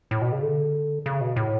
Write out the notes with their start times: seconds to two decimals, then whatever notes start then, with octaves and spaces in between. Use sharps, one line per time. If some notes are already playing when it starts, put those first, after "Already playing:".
0.11 A2
0.22 B2
0.32 C#3
0.42 D3
1.06 C#3
1.21 B2
1.36 A2